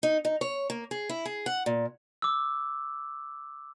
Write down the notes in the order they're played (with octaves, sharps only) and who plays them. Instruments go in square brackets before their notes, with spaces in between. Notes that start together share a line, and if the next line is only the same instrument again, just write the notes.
[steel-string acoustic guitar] D#4
D#4
C#5
A#3
G#4
E4
G#4
F#5
A#2
[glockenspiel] D6 E6